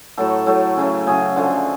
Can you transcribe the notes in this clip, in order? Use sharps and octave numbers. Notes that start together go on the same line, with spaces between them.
A2 F#3 A3 A4
A2 F#3 A3 A4
C#3 F#3 A3
C#3 F#3 A3 G#4
D3 F3 A3